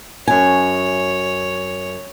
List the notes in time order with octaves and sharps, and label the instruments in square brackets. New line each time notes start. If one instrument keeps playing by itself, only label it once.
[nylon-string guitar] F#2 G#5 [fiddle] C#5